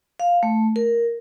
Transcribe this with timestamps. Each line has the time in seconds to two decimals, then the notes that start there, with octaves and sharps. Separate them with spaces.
0.20 F5
0.43 A3
0.76 A#4